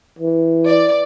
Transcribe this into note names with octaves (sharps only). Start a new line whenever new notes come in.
E3
D5